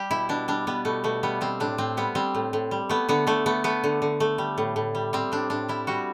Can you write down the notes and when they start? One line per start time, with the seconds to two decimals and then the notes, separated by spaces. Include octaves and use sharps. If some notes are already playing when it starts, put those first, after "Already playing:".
Already playing: G3 G4
0.11 B2 E4
0.29 B2 D4
0.48 G3 D4
0.67 G3 B3
0.85 B2 A3
1.04 B2 A3
1.23 G3 B3
1.41 G3 C4
1.60 A2 D4
1.78 A2 C4
1.97 G3 B3
2.15 G3 C4
2.35 A2
2.53 A2
2.71 G3
2.89 A3 B3
3.09 D3 B3
3.27 D3 A3
3.46 A3 B3
3.64 A3 B3
3.84 D3
4.02 D3
4.20 A3
4.38 G3
4.58 A2
4.76 A2
4.95 G3
5.13 G3 C4
5.32 A2 D4
5.50 A2 D4
5.68 G3 E4
5.87 G3 F#4